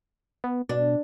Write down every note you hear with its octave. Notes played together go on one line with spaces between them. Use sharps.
B3
B2 D4